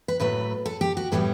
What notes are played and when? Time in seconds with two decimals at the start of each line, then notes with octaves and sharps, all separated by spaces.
0.08 B4
0.20 A2 F#3 A3 B4
0.66 A4
0.81 G4
0.97 F#4
1.12 A2 E3 G3 B3 A4